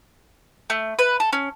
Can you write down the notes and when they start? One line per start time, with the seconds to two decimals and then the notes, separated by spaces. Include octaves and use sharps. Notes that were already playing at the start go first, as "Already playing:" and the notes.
0.70 A3
0.99 B4
1.20 A4
1.33 C#4